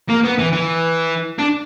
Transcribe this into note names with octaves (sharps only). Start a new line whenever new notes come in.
A#3
B3
E3
E3
D4